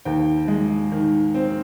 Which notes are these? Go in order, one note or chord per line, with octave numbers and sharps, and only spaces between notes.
D#2 G5
G#3
D#3
C4